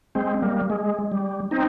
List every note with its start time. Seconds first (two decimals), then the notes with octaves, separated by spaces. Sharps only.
0.15 G#3 C4
0.42 G3 A#3
0.70 G#3
1.12 G3
1.51 C4 D#4